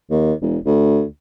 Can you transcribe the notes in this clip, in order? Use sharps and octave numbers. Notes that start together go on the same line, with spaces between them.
D#2
E1
D2